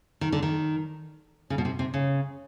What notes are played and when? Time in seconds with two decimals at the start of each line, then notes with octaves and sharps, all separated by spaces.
0.21 D#3
0.32 D3
0.43 D#3
1.50 C#3
1.58 B2
1.65 C3
1.79 C3
1.94 C#3